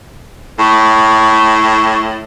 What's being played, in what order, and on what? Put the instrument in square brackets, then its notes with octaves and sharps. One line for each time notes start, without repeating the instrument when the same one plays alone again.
[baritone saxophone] A2 [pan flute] C#6